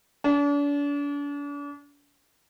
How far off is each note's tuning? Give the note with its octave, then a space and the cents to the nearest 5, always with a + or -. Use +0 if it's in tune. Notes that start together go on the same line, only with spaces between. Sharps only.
D4 -40